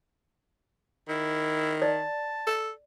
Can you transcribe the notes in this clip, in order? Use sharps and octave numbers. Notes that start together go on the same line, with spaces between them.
D#3 E4
D5 A5
A4